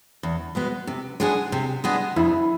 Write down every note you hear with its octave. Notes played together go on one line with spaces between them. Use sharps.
E2
B2 G#3 B3
C3
G#3 B3 D4 G#4
C3
G#3 B3 D4 G#4
F2 E4